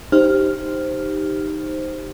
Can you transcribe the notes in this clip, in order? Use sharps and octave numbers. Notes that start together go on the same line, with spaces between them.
D#4 G4 C5 F6